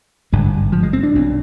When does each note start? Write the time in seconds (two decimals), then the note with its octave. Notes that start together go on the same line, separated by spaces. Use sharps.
0.32 G#1 G2 D3 G#3
0.72 F3
0.83 G#3
0.93 C4
1.03 D4
1.13 B1 B2